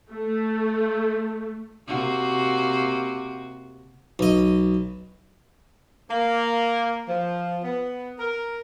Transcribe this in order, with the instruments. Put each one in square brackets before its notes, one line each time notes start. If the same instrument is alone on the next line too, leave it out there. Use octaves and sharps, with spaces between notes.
[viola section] A3
[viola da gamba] C3 A#3 F#4
[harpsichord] B1 D#5
[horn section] A#3
F3
B3
A#4